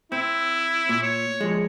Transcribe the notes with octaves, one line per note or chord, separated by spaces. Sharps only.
C4 E4
A#2
C#5
F3 G#3